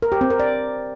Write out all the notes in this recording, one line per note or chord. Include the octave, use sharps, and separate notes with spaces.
A#4
G4
C4
A#4
D5